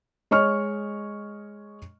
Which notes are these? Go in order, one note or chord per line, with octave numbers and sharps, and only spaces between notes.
G#3 C#5 D#5 C#6 F6